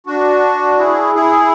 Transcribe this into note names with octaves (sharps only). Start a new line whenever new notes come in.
D4 F#4
E4 G#4
E4 G#4